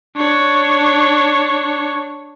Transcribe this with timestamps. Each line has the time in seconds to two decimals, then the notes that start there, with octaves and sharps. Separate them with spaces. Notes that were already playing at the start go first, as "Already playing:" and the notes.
0.17 D4 C#5